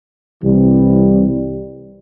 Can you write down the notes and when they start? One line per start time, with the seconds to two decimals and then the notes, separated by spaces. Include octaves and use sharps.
0.43 C2 C3 E3 G3